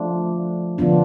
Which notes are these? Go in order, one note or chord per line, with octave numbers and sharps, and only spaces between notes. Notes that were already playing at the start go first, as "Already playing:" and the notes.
Already playing: F3 A3 D4 F4
D3 F3 B3 D4 F4